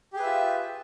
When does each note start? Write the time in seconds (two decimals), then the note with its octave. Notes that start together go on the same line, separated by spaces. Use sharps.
0.13 G4
0.16 G#4
0.19 B4
0.23 E5
0.26 F4